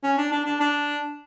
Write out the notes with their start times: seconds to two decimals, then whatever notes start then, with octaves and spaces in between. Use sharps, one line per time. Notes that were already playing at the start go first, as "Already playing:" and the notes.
0.03 C#4
0.17 D4
0.32 D4
0.46 D4
0.60 D4